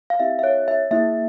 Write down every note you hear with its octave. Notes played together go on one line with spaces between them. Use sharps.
F5
C4 E4 G4 E5
E5
C#5
E5
A#3 E4 G#4 E5